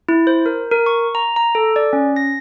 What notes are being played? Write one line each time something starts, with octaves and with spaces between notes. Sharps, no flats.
E4
C5
A#4
A#4
C#6
A#5
A#5
A4
D5
C#4
A#6